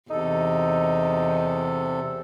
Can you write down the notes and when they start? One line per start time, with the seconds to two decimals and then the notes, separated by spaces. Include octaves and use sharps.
0.11 E2 C3 D#4 A4